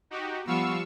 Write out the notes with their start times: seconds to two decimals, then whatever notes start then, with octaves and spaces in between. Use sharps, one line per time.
0.10 D#4 F#4 G4
0.47 F3 G3 B3 F5 C#6 E6